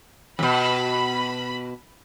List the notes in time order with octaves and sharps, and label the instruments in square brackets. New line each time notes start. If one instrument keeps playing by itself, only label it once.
[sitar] F2 B2 [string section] B5